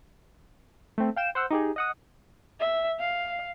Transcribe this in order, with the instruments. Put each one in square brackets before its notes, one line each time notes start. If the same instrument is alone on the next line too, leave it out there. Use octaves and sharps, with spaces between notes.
[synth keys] A3 C4
F5 G5 E7
C5 F#5 E6
D#4 G4 G#4
D#5 F#5 D#6
[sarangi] E5
F5